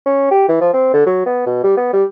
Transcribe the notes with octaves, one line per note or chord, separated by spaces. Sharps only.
C#4
G4
E3
F3
C4
D3
F#3
B3
B2
G3
B3
G3